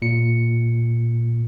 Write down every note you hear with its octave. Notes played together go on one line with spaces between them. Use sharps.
A#2 C#7